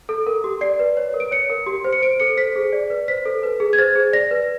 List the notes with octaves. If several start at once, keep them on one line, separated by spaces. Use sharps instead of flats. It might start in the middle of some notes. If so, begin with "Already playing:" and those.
A4
A#4
G4
D5 C7
B4
C#5
A#4
D7
C#5 C#7
A#4
G4
C5
C#7
C5 D7
A4 C#7
C5 B6
G#4
D5
B4
C5 B6
A4
B4
G#4
G#6
C5 A6
G#4
D5 A#6
B4